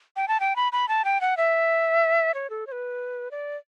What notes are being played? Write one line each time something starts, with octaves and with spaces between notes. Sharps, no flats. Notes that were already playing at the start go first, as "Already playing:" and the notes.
G5
A5
G5
B5
B5
A5
G5
F#5
E5
C#5
A4
C#5
B4
D5